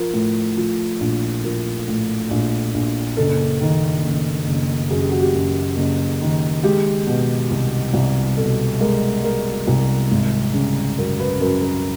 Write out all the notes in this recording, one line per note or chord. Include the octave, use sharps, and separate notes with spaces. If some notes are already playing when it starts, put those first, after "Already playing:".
Already playing: F3 A#4
A2
F3
A#1
F3 A#4
A2
A#1
A#1
F#1 A4
D#3
F#1
F#1
F#2 G#4
G4
F#4
G4
F#2
F#1
D#3
G#3 G4
B2
C2
C2
B2 A4
G#3 A#4
G#3 A#4
C2
G#1
C#3
F#2 A#4
B4
F#2 A#4
A#4